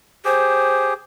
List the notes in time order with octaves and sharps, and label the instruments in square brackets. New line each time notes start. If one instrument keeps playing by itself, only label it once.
[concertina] G4 G#4 [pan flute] C5